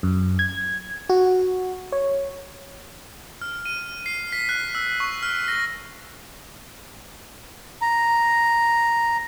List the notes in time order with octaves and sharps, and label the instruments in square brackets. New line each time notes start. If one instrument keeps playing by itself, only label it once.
[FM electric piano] F#2
G#6
F#4
C#5
[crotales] F6
D#7
C7
B6
F#6
E6
C#6
F6
A#6
[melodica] A#5